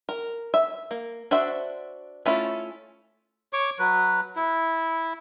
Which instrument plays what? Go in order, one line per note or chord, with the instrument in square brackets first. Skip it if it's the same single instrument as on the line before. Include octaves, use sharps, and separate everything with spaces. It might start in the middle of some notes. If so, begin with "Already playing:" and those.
[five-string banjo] A#4
E5
A#3
D4 F#4 C5 E5
A3 C#4 E4 F4
[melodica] C#5 C#6 D6
F#3 B4
E4